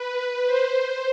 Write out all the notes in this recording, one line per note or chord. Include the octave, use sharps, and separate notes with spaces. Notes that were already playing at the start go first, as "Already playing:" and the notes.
Already playing: B4
C5